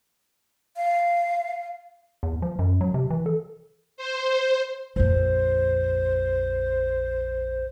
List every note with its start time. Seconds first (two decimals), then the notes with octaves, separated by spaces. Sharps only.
0.76 F5
2.23 E2
2.42 F3
2.59 F#2
2.81 F#3
2.94 C3
3.10 E3
3.26 A4
3.97 C5
4.96 A#1 F2 C5